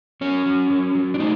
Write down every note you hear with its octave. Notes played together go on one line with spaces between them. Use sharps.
F#3 C#4
F#3
F#3
F#3
D4
A3 D#4